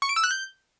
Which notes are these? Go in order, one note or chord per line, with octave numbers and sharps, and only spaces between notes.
C#6
D7
E6
F#6
G6